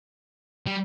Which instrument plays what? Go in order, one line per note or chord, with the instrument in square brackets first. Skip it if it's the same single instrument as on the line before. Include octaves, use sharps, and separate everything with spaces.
[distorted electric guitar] G3